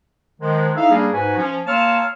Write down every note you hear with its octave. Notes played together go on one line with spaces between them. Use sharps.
D#3 F3 G#3
D#4 E4 A4 E5 F5
G3 A#3 C#4 D4 G#4
G#2 F#4 B4 G#5
F3 C#4
A#3 C#5 A5 C6 E6 F6